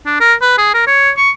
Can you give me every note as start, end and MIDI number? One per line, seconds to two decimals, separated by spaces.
0.06 0.17 62
0.20 0.34 70
0.42 0.54 71
0.58 0.72 68
0.74 0.86 70
0.87 1.10 73
1.18 1.30 85